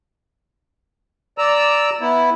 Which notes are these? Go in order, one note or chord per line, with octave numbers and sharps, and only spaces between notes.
D5 A#5 E6
B3 E4